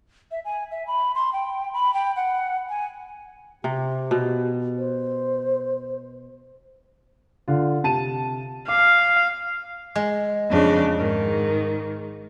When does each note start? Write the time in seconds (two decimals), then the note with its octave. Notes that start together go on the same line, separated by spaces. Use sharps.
0.31 E5
0.45 G#5
0.71 E5
0.87 B5
1.15 C6
1.33 G5
1.73 B5
1.94 G5
2.16 F#5
2.69 G#5
3.64 C3 G4
4.11 B2
4.78 C5
7.48 D3 F4
7.84 C3 A5 D#7
8.68 F5 D6
9.95 G#3
10.49 F2 C#3 D4
10.95 G#2 D#3